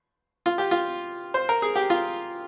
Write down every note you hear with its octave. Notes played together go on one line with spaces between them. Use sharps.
F4
G4
F4
C5
A#4
G#4
G4
F4